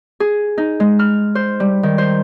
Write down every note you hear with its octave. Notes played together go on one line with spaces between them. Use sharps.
G#4
D#4
G#3
F6
C5
G3
D#3
C5